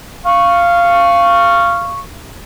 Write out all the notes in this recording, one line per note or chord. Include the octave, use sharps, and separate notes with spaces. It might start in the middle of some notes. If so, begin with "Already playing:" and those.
F5 C#6